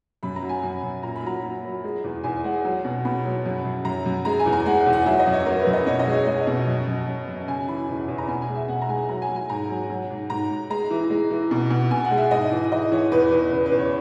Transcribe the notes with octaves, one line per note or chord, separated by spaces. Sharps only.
F#2 B5
A#5
F#3
G#5
F#2
F#2
A#2 A#5
B5
F#3 A#5
F#3
F#3
G#3
E2
E2 G#5
G#3 F#5
F#3
B2
B2 B5
F#3
F#2
F#2
F#2 A#5
F#2
G#3 A#5
G#5
E2
A#5
G#3 F#5
F#5
E2
F#5
F#3 E5
D#5
F#2
C#5
F#3 A#4
B4
F#2
D#5
B2 C#5
D#5
G#3 C#5
G#3 D#5
B2
F#2
F#2
F#2
F#2
C#3 G#5
E3 B5
E2
E2
A#5
B2 G#5
G#5
G#3
E5
B2 F#5
A#5
G#3 G#5
F#3 A#5
G#5
F#3
G#5
G#2 A#5
F#3
F#3
G#2
G#2 A#5
G#2
G#3 A#5
E3
G#3
E3
B2
B2
B2 G#5
F#5
G#3
E5
G#2 D#5
E3
E3 D#5
E3 C#5
E2 B4
E2 B4
C#3 B4
B4
E2
C#5